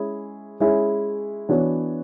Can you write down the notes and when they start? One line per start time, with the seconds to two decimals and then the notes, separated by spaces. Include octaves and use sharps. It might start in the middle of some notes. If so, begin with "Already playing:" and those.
Already playing: G#3 C#4 E4 G#4
0.60 G#3 C#4 E4 G#4
1.49 E3 B3 D4 F#4 C#5